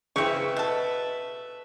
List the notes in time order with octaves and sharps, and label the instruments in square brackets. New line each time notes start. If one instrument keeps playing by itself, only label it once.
[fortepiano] C#3 E4 [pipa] C4 C#6 [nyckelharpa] B4 E5
[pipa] B2 A4